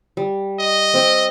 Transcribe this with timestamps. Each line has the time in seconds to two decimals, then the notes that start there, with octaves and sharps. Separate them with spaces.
0.17 G3
0.59 D#5
0.94 C4 G5